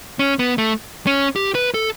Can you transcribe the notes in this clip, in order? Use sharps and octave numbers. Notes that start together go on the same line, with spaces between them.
C#4
B3
A3
C#4
G4
B4
A4